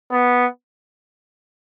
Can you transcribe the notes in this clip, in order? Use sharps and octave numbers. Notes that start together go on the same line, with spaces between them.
B3